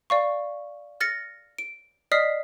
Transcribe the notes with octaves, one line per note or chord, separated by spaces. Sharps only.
D5 F5 C#6
F6 A6 A#6 C#7
D7
D5 D#5 D#6 F6 B6 C7